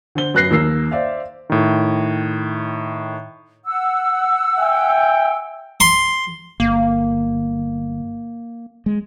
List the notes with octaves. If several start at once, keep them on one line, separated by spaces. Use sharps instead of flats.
D3 C5 G7
F#2 B4 F#6 A#6 C7
D#2 A#3 E6 C7
C5 D5 E5 F5
A2 D#3
F#5 E6
E5 G5 G#5
C6
G1 A#3
G#3